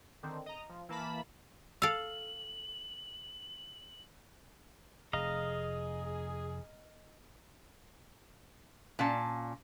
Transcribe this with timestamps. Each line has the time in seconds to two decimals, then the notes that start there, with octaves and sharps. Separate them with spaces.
0.23 D3 D#3 C4
0.46 D#5 A#5
0.69 F3
0.89 E3 A#3 A5 B5
1.82 A4 F5 E6 F7 F#7
5.13 F1 G#4 D#5 F5 A#5
8.99 A#2 C#4 F5 A5